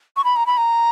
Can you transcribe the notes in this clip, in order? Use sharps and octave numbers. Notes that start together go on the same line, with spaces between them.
C#6
B5
A#5
B5
A#5